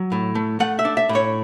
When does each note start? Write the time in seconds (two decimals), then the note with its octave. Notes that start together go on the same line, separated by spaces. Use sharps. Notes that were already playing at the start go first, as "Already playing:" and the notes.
Already playing: F#3
0.12 A2
0.35 A3
0.60 A3 F#5
0.79 E5
0.85 D4
0.97 E5
1.09 A2
1.15 C#5